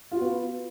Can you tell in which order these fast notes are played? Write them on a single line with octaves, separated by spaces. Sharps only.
F4 F#4 B3